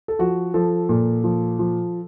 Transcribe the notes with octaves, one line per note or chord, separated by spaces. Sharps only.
A4
F3 F#4
F3 A4
A#2 A4
F3
F3